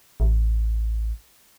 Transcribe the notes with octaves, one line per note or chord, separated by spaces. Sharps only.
A1